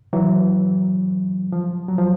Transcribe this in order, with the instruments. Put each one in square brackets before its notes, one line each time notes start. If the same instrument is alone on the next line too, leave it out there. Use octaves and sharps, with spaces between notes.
[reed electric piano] E3 F#3
F3
F#3
F3